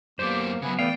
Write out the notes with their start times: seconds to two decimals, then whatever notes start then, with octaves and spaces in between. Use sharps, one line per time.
0.19 F#2 A#3 B3 G4 C5 D5 D6
0.62 C#3 F#3 B3 E5 G#5 B5
0.79 E3 A3 B3 D5 F5 G5